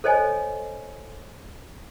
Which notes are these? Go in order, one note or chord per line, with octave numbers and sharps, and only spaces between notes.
A4 C5 C#5 D#5 G#5